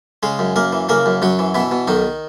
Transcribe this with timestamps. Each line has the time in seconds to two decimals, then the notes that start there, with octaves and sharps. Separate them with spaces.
0.23 C#3 G#3 G#4
0.39 F#2
0.56 F#2 A#3 A#4
0.73 E3
0.89 C#3 A#3 A#4
1.06 F#2
1.22 F#2 F#3 F#4
1.39 E3
1.54 B2 E3 E4
1.71 B2
1.88 B1 D#3 D#4